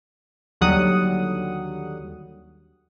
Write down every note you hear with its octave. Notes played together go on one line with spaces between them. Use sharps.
D#2 D3 F#3 G3 F#5 D#6